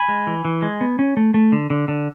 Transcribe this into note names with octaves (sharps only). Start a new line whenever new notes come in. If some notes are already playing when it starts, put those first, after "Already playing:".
Already playing: G#5 B5
G#3
E3
E3
G#3
B3
C#4
A3
A3
D3
D3
D3